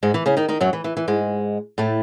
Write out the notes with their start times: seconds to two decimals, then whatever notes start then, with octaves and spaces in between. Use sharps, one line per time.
0.03 G#2 G#3
0.14 E3
0.26 C#3 C#4
0.37 D#3 D#4
0.48 D#3 D#4
0.60 F#2 F#3
0.73 E3
0.84 E3
0.97 E3
1.08 G#2 G#3
1.78 A2 A3